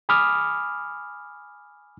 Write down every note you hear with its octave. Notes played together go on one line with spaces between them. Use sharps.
G#5 B5 D6 D#6 F6